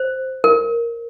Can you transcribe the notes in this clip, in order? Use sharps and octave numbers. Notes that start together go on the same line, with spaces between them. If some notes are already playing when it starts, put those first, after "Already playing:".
Already playing: C5
A#4